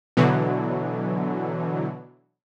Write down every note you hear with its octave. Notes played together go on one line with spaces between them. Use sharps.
B2 D3 E3 F#3